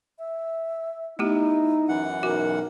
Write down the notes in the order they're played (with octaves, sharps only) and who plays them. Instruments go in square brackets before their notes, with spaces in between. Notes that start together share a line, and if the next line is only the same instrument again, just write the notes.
[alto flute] E5
[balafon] A3 B3 G4 [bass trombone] D#4 [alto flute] E4
[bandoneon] F#2 E3 F#5
[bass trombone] B1 [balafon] F#4 [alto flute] A#4